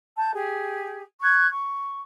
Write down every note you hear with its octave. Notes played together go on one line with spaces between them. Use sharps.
A5 G6
G4 G#4
C#6 F#6 G#6
C#6